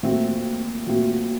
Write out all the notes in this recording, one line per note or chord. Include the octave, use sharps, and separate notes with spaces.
A#2 A3 C4 F#4
A#2 A3 C4 F#4